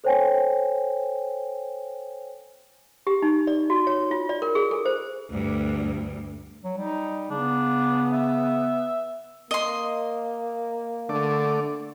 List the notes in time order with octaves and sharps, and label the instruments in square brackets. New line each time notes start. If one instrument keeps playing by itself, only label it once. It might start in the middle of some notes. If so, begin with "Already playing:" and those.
[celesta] A4 C5 C#5 G5 G#5
[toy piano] G4
D#4
D5
F#4
C#5
F4
D5
A#4
G#4
A4
C5
[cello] D2 G2
[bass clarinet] F#3
[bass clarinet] G3 [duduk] D#4
[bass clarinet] C#3 [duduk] B3 [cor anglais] D4
[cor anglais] E5
[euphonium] A#3 [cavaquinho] D#5 C6
[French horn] D3 [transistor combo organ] A3 D5